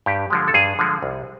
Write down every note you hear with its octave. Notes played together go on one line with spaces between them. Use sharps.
G2 G4
D3 F3 G#3
A4
G2 G#4
D3 F3 G#3
C2